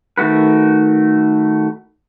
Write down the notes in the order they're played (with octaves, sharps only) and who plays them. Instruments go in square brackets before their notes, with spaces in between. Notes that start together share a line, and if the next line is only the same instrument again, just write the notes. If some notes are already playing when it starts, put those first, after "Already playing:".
[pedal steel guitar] D#3 A3 F#4 B4